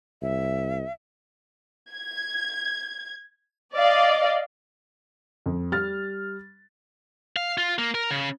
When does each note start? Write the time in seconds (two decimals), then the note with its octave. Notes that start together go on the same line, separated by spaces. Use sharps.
0.22 C2 E5
1.92 G#6
3.75 D5 D#5 F5
5.46 F2
5.72 G3 F6 A6
7.36 F5
7.58 F4
7.78 A#3
7.95 A#4
8.11 C#3